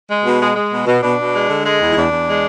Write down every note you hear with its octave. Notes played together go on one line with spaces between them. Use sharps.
G#3
B2
G#3
G#3
B2
B2
B2 D4
B2
G#3
D3
G#3
E2
E4
E2 D4
E2
G#3